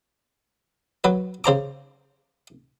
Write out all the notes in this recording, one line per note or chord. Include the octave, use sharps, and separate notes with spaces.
F#3 B4
C#3 C5 A#5 D6